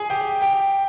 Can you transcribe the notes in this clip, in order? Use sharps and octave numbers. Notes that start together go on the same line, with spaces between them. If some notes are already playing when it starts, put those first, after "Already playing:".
Already playing: G#4 G#5
G4 G5
G4 G5